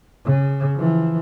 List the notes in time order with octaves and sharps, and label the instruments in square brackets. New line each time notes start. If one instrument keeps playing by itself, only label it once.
[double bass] C#3
E3 F3